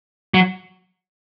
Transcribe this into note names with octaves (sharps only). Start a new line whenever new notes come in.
F#3